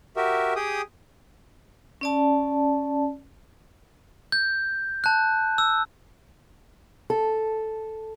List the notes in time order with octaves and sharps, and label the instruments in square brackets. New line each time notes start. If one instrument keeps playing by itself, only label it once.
[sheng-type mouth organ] F#4 G4 A#4 E5
G4 G#4 G5 D#6
[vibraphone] C#4 D5 A5
[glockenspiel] G6
A5 F#6
E6
[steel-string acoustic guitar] A4